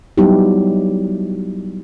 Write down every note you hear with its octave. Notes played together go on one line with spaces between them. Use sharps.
F#3 G3 B3 D#4 E4 G4